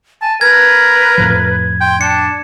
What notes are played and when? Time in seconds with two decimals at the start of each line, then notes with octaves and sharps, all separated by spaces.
0.22 G#5 A5
0.41 A#4 B4 G#6
1.18 F2 A2 F3
1.81 G5 C6
2.01 D4 A5 C#7